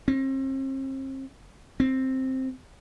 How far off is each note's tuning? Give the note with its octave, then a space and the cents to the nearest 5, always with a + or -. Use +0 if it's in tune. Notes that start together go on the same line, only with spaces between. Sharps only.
C4 +40
C4 +5